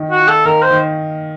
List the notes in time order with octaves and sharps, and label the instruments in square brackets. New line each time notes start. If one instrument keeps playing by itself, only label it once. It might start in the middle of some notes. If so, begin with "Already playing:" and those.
Already playing: [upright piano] D#3
[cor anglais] F#4
[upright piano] F4
[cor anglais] A4
[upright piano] D#3 [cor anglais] A#4
[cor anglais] C5
[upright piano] D#3